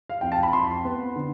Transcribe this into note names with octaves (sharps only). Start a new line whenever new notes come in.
F5
F2 G5
A5
B5
F2 C6
B3
D3